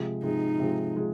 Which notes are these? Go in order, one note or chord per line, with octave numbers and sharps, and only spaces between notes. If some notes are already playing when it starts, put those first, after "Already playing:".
Already playing: C3 F3 G#3
C3 F3 G#3 D#4
C3 F3 G#3
C3 F3 G#3